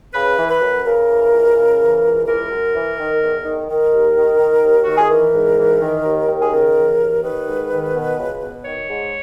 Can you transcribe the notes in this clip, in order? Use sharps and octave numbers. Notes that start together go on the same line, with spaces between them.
C#3 B4
E3
B4
F#2
C#3 A#4
E3
C#2
C#3
E3
C#2
E3 A#4
F#2
E3
D#3
E2
D#3
D#3 A#4
D#2
D#3
D#3
D#2
D#3 F#4
G#4
E3 A#4
G#2
E3
D#3
D#2
D#3
G#4
C#3 A#4
E3
D#2
D#3 B4
G#2
D#3
B2
C#2
B2
D#3 C#5
G#2